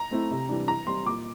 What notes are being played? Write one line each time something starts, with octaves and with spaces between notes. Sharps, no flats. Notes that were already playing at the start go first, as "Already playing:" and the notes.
Already playing: A#5
A3 C4 E4
C3
E3 G3 D4
E3 A#5
G3 C4 C6
A#2 D6